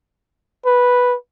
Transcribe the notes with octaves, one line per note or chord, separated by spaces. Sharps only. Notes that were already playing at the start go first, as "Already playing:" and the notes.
B4